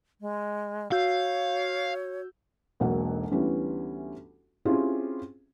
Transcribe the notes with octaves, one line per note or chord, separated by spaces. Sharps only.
G#3
F#4 C#5 F5 E6 G6
E1 B1 A#3 F#4 F#5
D2 E3 G3 B3 C#4
C4 C#4 E4 F4 G4 G#4